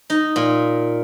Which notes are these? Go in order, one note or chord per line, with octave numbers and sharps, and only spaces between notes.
D#4
A#2